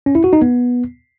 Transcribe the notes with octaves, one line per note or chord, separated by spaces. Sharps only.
C#4
E4
F#4
D#4
B3